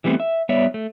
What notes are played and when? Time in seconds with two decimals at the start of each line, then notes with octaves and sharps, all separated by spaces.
0.04 E3 G3 A3 B3 C4
0.20 E5
0.49 G3 B3 C#5 D5 E5
0.74 A3